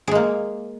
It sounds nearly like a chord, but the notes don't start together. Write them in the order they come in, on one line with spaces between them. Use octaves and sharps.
G#4 G#3 A#3